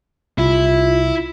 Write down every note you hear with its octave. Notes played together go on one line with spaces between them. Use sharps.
C2 E4 F4